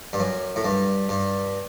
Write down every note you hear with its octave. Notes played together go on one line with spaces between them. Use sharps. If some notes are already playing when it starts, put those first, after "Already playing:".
G2
F#2
A2
G2
G2